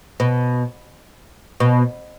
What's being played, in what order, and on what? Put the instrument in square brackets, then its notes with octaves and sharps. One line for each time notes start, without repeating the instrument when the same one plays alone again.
[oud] B2
B2